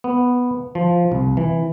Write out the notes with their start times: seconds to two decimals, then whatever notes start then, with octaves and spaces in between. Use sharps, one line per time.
0.04 B3
0.75 F3
1.12 C2
1.37 E3